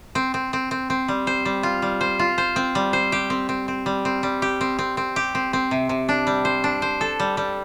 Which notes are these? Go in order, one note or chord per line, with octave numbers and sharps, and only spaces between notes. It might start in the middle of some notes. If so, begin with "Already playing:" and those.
C4
C4
C4
C4
C4
G3
C5
G3
F4
G3
C5
F4
C5
C4
G3
C5
G4
C4
C4
C4
G3
C4
G3
G4
C4
C4
C4
G4
C4
C4
C3
C3
D4
G3
C5
D4
C5
A4
G3
G3